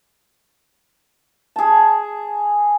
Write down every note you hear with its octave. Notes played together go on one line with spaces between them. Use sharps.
G#4 A5